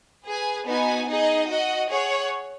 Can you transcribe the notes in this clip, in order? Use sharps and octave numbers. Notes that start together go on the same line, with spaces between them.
G#4 B4 G#5
B3 D#4 F#4 B4 G#5
D#4 G#4 D#5
F#4 D#5 F#5
G#4 C#5 F#5